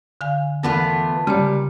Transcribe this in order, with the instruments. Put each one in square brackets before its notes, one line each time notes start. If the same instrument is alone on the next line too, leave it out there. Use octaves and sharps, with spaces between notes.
[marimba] D3 F5 G#5
[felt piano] E2 [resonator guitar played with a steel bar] A3 B3 F4 [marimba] A#4 [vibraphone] A5
[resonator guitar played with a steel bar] A#2 [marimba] C#3 C#5 [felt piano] G3